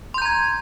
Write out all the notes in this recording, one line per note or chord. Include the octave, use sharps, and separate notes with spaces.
A#5 C6 G6 G#6